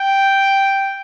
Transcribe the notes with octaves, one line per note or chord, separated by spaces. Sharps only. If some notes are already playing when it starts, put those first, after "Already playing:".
Already playing: G5